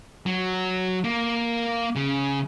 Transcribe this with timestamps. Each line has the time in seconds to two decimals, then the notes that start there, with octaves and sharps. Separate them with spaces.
0.26 F#3
1.04 A#3
1.96 C#3